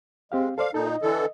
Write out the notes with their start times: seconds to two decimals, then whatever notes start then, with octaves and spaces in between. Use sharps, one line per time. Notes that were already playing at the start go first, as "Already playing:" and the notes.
0.32 G#3 C4 G4 F5
0.58 A4 C5 D5 F5
0.74 A#2 D#4 A4
0.87 D#5
1.02 D3 E3 A4